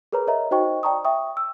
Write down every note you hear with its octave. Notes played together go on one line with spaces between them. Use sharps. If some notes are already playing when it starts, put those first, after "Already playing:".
G#4 A#4 B4 C#5 A#5
A#4 C#5 D#5 E5 A#5
D#4 F#4 C5 D#5 G5 C#6
D5 G5 A5 A#5 C#6 D#6
E5 G5 C#6 D#6
E6